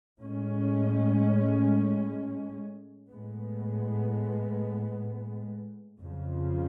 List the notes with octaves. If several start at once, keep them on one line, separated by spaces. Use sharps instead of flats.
A2 G#3 C#4
A2 G#3 B3
F2 C#3 F3